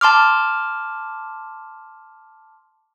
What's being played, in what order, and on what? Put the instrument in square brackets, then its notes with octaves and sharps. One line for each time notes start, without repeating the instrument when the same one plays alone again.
[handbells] A5 C6 D6 F6